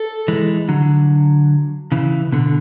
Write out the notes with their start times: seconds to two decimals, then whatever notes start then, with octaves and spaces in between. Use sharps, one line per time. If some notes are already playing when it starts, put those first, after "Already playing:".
Already playing: A4
0.28 E3 G#3
0.69 D3 F#3
1.92 C#3 E3
2.32 B2 D3